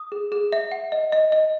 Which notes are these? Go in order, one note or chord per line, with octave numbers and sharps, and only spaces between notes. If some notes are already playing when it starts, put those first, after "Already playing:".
Already playing: D#6
G#4
G#4
E5
F#5
D#5
D#5
D#5